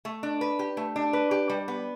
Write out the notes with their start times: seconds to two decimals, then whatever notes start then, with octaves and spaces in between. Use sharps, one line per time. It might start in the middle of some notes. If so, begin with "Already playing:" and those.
0.05 A3
0.23 D4
0.41 B4
0.59 G4
0.77 A3
0.96 D4
1.13 B4
1.31 G4
1.50 G3
1.68 B3